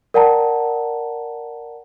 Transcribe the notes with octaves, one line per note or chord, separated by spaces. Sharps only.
A#4 D5 F#5 G5 A5 A#5